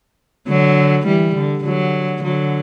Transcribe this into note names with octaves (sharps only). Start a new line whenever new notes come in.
D3 F#3
E3 G3
D3
D3 F#3
D3 F#3